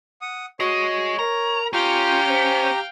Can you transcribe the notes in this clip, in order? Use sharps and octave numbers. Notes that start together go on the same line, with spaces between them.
F#5 D#6
F#4 G#4 C#5 D#5
A#4 A#5
C#4 F4 G4 F5 G5 A#5
C5